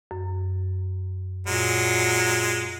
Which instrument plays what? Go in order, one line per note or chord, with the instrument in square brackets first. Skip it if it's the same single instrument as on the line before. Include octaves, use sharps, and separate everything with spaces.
[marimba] F#2
[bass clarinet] A#2 [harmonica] F#3 G#3